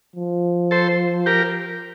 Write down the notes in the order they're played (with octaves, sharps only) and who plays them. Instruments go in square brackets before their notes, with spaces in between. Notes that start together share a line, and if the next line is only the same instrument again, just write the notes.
[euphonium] F3
[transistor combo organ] A4 C5
G4 A#4